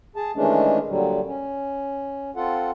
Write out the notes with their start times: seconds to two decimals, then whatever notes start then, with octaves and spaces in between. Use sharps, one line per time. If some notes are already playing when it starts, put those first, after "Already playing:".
0.16 G#4 A5
0.36 D#3 E3 G#3 A3 C#4 D4
0.88 A#2 D3 F#3 G3
1.26 C#4
2.36 C4 F4 A4 F#5